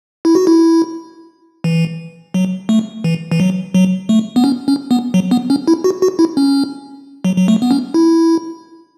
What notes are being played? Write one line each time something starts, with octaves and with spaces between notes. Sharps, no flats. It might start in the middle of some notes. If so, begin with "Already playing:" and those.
E4
F#4
E4
E3
F#3
A3
E3
E3
F#3
F#3
A3
B3
C#4
C#4
B3
F#3
B3
C#4
E4
F#4
F#4
E4
C#4
F#3
F#3
A3
B3
C#4
E4